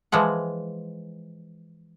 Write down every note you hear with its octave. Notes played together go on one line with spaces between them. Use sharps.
E3 F3 G#3 F#5